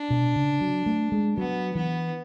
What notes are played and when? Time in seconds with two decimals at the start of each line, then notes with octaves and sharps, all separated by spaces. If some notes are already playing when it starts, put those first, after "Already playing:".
Already playing: D4
0.10 B2
0.36 C#3
0.61 F#3
0.86 A3
1.12 G#3
1.37 F#3 B3
1.75 E3 B3